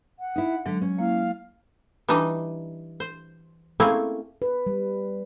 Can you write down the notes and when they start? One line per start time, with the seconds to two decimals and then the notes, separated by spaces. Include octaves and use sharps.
0.19 F#5
0.36 D#4 E4
0.66 D3 F#3 G#3
0.82 C#4
0.99 A#3 E4 F5
2.08 E3 G3 D4 D#4 D#5
3.00 C5
3.80 A3 A#3 C4 C#4 E4 G#4
4.42 B4
4.67 G3